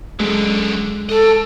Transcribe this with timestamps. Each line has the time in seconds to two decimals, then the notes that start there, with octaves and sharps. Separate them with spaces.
0.20 F#2 D3 G#3
1.09 A4 D#5 A5